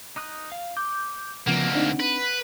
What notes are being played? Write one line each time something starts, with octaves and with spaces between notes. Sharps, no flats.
D#4 D#6 F#6
F5
D6 G6
D2 C#3 F3 A#3 B3 F#5
C4 D4 D#4
B4